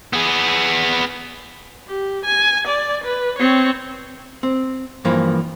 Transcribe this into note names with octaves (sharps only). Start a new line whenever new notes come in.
B3 G#4
G4
G#5
D5
B4
C4 C#5
C4
G2 E3 F3 A#3